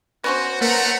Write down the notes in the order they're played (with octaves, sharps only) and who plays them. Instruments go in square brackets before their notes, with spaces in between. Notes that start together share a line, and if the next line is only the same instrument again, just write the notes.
[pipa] B3 C#4 C5 [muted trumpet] F#4
[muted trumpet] A3 [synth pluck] A#3 A#4 B4 [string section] F#5 A#5